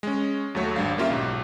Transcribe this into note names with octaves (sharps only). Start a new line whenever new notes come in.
G#3 C#4
D#2 F#3 A3 C#5
G#1 G3 D4 F5
A#3 C#4 F4 G4 E5
B1 G#2